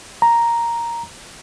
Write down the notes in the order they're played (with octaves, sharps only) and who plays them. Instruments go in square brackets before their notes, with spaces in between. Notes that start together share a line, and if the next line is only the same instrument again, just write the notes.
[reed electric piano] A#5